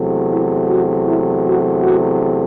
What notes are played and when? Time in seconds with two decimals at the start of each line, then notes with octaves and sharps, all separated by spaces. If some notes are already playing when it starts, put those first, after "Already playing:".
Already playing: E2 C3 F#3 A3
0.30 E4
0.70 F#4
1.07 E4
1.45 F#4
1.83 F#4